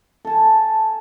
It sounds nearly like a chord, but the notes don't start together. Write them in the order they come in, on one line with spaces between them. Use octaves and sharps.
A4 A5 G#5